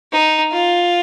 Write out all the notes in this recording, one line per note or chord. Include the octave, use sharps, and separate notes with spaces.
D#4
F4